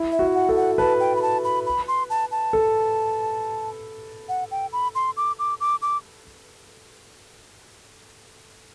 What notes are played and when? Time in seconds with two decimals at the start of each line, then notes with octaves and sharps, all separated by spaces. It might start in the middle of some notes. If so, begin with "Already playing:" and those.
Already playing: E4
0.12 E5
0.19 F#4
0.35 F#5
0.49 A4
0.56 F#5
0.78 B4 A5
1.00 G5
1.16 B5
1.22 A5
1.44 B5
1.66 B5
1.88 C6
2.10 A5
2.31 A5
2.53 A4
4.29 F#5
4.51 G5
4.73 B5
4.95 C6
5.17 D6
5.39 D6
5.61 D6
5.82 D6